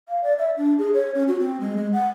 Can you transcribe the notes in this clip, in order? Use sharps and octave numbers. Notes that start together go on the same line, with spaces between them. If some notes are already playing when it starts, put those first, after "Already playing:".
F5
D5
E5
D4
G#4
C#5
C#4
F#4
C4
G#3
G#3
F#5